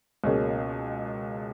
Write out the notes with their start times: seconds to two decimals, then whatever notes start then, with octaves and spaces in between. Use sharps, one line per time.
0.24 C#2 B2 A#3 C#4 G#4